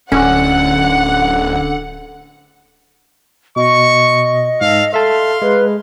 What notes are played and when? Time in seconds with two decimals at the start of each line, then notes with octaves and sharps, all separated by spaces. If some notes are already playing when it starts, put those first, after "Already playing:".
0.12 D1 D3 C#4 F#5
3.56 B2 D#5 C#6
4.61 G#2 A4 F5
4.94 A4 E5 F5 A5 C6
5.42 G#3 B4